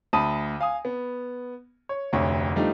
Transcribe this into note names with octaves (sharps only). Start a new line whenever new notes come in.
D2 A5 B5 D#6 D#7
F5 G#5 D#6
B3
C#5
F1 D2 C#5
F3 G3 A3 D4 D#4